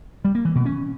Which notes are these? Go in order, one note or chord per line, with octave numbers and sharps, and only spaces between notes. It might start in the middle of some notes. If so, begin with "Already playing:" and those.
G3
A#3
E3
B2
C#4